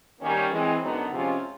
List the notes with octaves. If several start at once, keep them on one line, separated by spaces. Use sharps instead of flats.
D#3 G3 A#3 C#4
E3 G#3 C4
F#2 D3 F#3 B3 D#4
C3 F3 G#3 C#4 F4